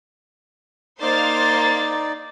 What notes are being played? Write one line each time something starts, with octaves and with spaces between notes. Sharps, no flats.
A#3 D#4 C5 D5 F5 A6